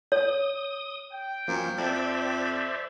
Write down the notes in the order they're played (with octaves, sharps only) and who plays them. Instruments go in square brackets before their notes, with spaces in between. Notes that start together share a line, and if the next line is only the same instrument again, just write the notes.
[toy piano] C#5 [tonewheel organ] D#6
[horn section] G5
[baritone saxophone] F#2 [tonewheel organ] F3 A#3
[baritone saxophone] F2 [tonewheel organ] C5 D5 E5